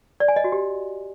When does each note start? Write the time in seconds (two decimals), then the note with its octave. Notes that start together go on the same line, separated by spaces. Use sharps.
0.20 D5
0.28 G#5
0.36 D#5
0.44 F#4
0.52 G4